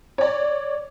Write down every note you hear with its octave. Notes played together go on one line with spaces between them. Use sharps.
C#5 D5